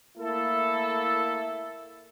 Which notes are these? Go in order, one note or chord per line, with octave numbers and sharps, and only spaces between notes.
A3 A#3 E4 A4